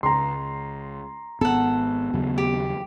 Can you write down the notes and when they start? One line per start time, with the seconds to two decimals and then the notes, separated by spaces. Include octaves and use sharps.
0.03 C#2 A#5 C6
1.41 G#1 B3 A4 F#5
2.13 D#2 C#3 F#3
2.38 G4